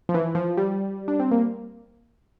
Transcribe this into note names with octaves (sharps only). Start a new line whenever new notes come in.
F3
E3
F3
G3
D4
C4
A#3